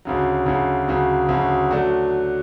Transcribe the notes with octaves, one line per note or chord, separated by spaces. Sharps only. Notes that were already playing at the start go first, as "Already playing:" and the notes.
D2 C#3 F#3
D2 C#3 F#3
D2 C#3 F#3
D2 C#3 F#3
F#3 A3 D4 F#4